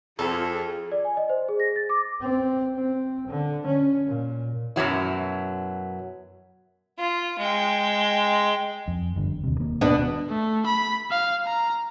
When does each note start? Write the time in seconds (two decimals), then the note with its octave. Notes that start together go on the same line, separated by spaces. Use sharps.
0.19 F2 F4 G#4 A4
0.92 D5
1.05 G#5
1.17 D#5
1.29 C5
1.49 G#4
1.60 A#6
1.76 A6
1.90 D6
2.20 C4
2.76 C4
3.27 D3
3.66 C#4
4.07 A#2
4.76 F#2 B2 F#3 E4
6.98 F4
7.38 G#3 G5
8.88 F2
9.16 G1 G2 D3
9.44 D#2 C3
9.60 E1 D#2 A#3
9.81 B2 B3 D4
10.29 A3
10.66 B5
11.11 F5
11.46 A#5